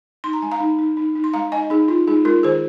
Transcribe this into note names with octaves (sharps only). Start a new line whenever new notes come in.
D#4 C6
A#5
G#3 G#5
F5 A#5
D#4
D#4
D#4
D#4
C6
G#3 F5 A#5
D#4 D#5 G#5
D#4 G#4
D#4 F4
G#3 D#4 G#4
G#3 F4 A#4
D#3 G#4 C5